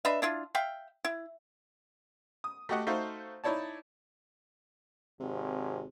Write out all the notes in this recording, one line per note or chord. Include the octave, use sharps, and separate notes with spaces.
D4 B4 D#5 E5
D4 E4 F4
E5 F5 G5
E4
D#6
A3 F#4 G4 D#5 F#5
A3 D#4 F#4 C5 E5 F5
D#4 E4 C#5 D5 A5
G#1 C3